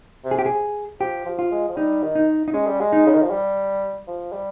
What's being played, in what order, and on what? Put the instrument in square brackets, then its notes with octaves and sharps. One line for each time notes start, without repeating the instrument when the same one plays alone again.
[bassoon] C3
[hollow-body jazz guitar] G#4
G4
G#4
[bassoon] F3 [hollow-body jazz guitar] G4
[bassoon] F3
[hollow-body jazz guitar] F4
[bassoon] G#3
F3
[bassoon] G3 [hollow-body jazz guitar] D#4
[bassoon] D#3
[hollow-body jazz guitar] D#4
D#4
[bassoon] G#3 [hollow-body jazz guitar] C#4
[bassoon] G3
G#3
[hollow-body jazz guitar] D#4
[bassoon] C#3
D#3
F3
G3
F3
G3